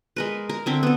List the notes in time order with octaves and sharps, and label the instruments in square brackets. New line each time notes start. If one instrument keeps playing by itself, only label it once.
[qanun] G#3 A#4 B4
A#4
D3 C4 E5
B3 A4